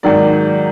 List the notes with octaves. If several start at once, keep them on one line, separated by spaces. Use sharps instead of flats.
G#2 D#3 F#3 A#3 D5